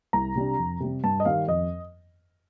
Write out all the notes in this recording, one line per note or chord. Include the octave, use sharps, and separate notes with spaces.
C2 A#5
C3 G3 D4
F2
C3 G3
G2 A5
D#5
D#3 G3 F5
F2 D#5